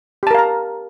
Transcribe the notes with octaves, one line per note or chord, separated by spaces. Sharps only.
G4 A#4 F5 A5 A#5